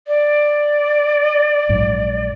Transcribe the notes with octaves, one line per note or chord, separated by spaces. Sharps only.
D5
A#1 G#2 F#3